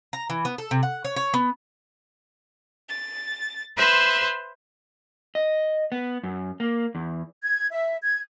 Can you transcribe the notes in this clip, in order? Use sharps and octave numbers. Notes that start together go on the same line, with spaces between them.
A#5
E3
B3
A4
C3
F#5
C#5
C#5
B3
A6
B4 C5 E5 C6
D#5
B3
F#2
A#3
E2
G#6
E5
G#6